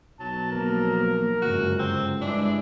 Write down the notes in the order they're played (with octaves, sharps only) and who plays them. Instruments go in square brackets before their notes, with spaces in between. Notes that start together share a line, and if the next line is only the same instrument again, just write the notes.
[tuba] B1 [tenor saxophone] F#3 [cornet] A5
[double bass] F3 A#3 [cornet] A#4
[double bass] G1 F#2 [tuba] C#2 [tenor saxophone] F#4
[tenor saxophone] C4
[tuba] G2 [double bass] G#3 E4 [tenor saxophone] D4